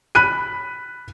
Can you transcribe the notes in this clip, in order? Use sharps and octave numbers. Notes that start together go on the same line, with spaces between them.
B5 F#6 D#7